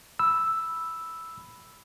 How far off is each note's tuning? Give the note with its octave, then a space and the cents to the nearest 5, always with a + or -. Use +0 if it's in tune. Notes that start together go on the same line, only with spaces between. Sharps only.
B5 +0 E6 +0